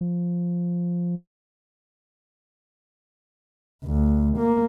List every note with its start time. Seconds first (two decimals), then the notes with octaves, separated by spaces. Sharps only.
0.01 F3
3.84 D2
4.37 A#3